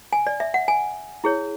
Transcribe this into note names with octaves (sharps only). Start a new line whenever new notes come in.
G#5
D5
E5
F#5
G#5
E4 G#4 C#5